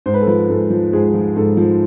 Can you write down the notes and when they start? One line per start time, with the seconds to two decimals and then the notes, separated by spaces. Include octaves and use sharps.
0.06 G#2 C5
0.14 B4
0.21 A4
0.27 F3 B4
0.49 G#2 A4
0.70 F3
0.93 G#2 G#4
1.14 F3
1.36 G#2 A4
1.57 F3